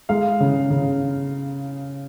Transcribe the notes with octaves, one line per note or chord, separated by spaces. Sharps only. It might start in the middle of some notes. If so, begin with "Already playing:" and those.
G#3 F5
C#3
C#3